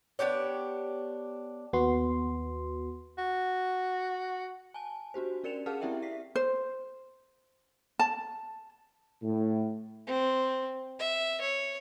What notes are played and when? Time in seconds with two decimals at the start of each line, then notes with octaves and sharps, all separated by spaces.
0.19 B3 D4 G4 C#5
1.73 D#2 B3 F#4 C6
3.18 F#4
4.74 G#5 A5
5.14 D4 F#4 G4 C5
5.44 C#4 A#4 D5 C#7 E7 F7
5.66 G#4 A#4 F5 F#5 A5 F6
5.81 C4 E4 G4 D5 E5 G5
6.02 E5 B6 C7
6.35 C5
7.99 A5
9.23 A2
10.07 C4
10.99 E5
11.41 C#5